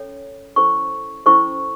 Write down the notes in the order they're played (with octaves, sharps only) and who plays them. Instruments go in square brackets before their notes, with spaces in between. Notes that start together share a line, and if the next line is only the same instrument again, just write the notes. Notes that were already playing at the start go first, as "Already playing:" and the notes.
Already playing: [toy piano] C#4 A4 C#5
C#4 E4 A4 C5 C#6
C#4 E4 A4 C5 C#6